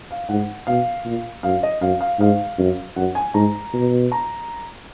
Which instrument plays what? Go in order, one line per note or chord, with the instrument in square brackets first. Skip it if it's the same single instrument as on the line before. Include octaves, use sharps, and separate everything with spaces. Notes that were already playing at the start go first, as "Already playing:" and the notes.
[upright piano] F5
[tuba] G#2 [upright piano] F#5
[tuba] B2 [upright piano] F5
[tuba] A#2
[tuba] F#2 [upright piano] F5
[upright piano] D#5
[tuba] F#2 [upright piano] F5
[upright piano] F5
[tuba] G#2 [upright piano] F5
[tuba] F#2
[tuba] F#2 [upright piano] F#5
[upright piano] G#5
[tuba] G#2 [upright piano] A#5
[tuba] B2
[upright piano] A#5